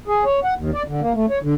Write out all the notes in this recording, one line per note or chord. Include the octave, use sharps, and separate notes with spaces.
G#4
C#5
F#5
D#2
D5
D3
A#3
A3
C#5
D3